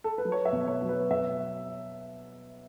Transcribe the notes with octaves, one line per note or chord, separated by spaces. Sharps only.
A4
B4
F#3
C#5
E5
B2
C#5
F#3
B4
B2 E5